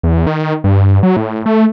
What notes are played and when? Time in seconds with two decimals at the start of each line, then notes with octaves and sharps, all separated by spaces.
0.03 E2
0.27 D#3
0.64 G2
1.03 F#3
1.17 A2
1.46 A3